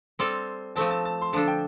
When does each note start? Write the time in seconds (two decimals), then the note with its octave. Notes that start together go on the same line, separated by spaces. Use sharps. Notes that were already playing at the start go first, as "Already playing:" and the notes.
0.19 G3 C4 A4 C6
0.76 F3 A3 C4 A5
0.90 A5
1.05 A5
1.22 C6
1.33 D3 F3 D4 A4 A5
1.48 G5